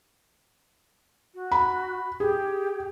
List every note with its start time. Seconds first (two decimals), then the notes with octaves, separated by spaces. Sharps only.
1.35 F#4
1.52 B5
2.20 G4 G#4